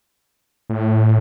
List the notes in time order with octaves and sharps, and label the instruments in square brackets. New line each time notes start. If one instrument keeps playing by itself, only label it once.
[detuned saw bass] A2